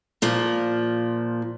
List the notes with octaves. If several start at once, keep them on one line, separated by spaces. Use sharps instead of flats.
A#2 F3